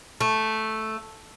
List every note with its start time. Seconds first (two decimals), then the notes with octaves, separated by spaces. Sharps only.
0.21 A3